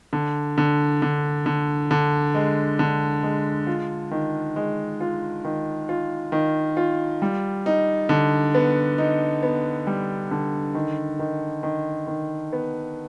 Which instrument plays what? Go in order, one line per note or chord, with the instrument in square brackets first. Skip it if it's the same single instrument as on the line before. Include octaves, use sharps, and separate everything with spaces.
[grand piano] D3
D3
D3
D3
D3
G#3
D3
G#3
F4
D#3
G#3
F4
D#3
F4
D#3
F4
G3
D#4
D3
B3
D#4
B3
G3
D3
D#3
D#3
D#3
D#3
B3